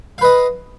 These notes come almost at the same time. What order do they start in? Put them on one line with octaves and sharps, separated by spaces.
F5 B4 D#5